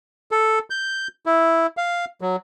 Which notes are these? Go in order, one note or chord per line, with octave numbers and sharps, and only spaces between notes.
A4
G6
E4
F5
F#3